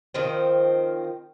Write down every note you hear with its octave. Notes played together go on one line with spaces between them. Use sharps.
D#3 F3 C4